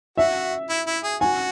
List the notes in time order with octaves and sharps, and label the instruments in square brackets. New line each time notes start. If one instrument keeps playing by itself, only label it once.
[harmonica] F#4 [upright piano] E5
[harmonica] E4
E4
G#4
[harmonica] F#4 [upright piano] G#5